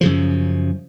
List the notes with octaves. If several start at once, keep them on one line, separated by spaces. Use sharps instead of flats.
F#2 C#3 F3